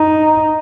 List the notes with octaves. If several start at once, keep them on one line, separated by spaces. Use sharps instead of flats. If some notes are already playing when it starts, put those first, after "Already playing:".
Already playing: D#4